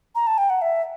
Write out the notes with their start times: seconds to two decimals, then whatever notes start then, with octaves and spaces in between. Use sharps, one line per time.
0.15 A#5
0.27 A5
0.38 G5
0.50 F#5
0.62 E5